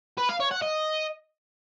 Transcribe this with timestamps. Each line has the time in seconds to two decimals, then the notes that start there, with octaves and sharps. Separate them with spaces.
0.18 B4
0.29 F5
0.40 C#5
0.51 F#5
0.62 D#5